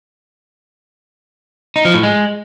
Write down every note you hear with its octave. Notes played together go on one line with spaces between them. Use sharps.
D#4
F3
A2
G#3